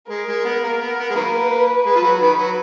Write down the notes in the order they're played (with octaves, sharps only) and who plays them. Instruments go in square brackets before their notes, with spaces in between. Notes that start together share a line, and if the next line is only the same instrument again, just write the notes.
[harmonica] G#3 [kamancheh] A#4
[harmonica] G#3
B3
A#3
B3
B3
G#3
[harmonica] D#3 F#3 A#3 [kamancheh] B4
[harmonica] G#3 [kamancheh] B4
[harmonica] F3
F#3
[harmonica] D#3 [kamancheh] B4
[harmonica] F#3